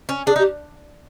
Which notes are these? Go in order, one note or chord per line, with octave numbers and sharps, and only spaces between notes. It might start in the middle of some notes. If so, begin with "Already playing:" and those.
C#4
D4 G#4
D#4
G4